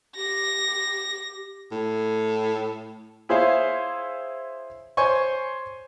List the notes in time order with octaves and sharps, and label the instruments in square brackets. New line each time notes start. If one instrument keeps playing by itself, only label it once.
[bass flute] G4 [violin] A#6
[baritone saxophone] A2
[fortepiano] E4 G#4 C5 C#5 E5 F5
C5 C#5 G#5 C6 C#6